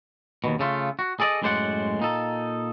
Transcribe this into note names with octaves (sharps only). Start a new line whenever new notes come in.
D#2 B2
C#3 A3 F4
F#4
G#4 A4 D5 D#5
F#2 A2 G#3 C5 D5 F#5
A#2 D#4 A4